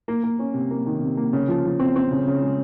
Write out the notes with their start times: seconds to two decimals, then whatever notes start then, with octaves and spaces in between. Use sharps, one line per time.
0.08 A#3
0.24 A#3
0.39 C#4
0.54 C3
0.71 A#3
0.86 D#3
1.01 C3
1.17 A#3
1.33 C#3
1.48 F3
1.65 F3
1.79 C4
1.96 C4
2.11 C#3
2.27 C#3
2.43 G#3